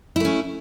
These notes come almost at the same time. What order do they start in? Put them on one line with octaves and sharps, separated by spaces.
E4 A3 C#4